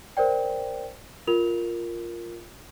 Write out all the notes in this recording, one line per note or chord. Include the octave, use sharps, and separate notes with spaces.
A#4 C5 D5 G5
F4 A#4 F7